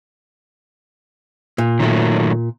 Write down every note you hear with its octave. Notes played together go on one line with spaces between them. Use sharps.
A#2
D#3 F#3 A3